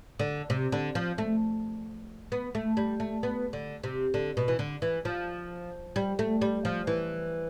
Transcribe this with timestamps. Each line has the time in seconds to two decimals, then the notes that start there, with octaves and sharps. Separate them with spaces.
0.19 D3
0.50 C3
0.72 D3
0.95 F3
1.18 A3
2.32 B3
2.55 A3
2.77 G3
3.00 A3
3.23 B3
3.53 D3
3.84 C3
4.14 D3
4.37 B2
4.48 E3
4.59 D3
4.82 E3
5.05 F3
5.96 G3
6.19 A3
6.42 G3
6.65 F3
6.87 E3